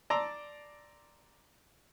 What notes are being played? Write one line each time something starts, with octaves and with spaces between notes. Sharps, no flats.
D5 A5 A#5 C6 D6 E6